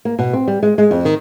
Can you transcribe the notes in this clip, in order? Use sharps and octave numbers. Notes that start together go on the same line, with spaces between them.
A#3
B2
C4
G3
G#3
G#3
F2
D#3